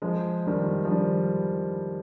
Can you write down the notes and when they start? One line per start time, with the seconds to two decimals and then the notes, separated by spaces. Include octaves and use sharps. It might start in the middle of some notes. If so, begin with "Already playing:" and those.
0.02 F3 G#3
0.47 D#3 G3
0.85 F3
0.91 D#3 G3